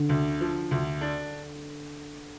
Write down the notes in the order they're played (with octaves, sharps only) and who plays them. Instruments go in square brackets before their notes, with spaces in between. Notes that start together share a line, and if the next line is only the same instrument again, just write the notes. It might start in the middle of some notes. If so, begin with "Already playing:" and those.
Already playing: [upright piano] D3
[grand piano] D2
F3
D2
D4